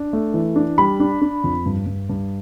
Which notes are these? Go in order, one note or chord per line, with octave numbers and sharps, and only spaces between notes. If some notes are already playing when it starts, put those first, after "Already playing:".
Already playing: D4
A3
E3
D4
G3 B5
D4
D4
F2
G2
G2
G2